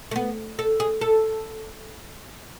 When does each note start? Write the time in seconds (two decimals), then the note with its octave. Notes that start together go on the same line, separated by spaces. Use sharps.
0.11 A3
0.16 B3
0.59 A4
0.80 G#4
1.01 A4